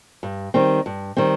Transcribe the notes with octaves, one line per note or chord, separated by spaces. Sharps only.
G2
D#3 G3 C4
G2
D#3 G3 C4